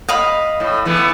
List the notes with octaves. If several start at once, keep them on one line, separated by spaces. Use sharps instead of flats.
D#5 F5 B5
A2
E3 A3 B3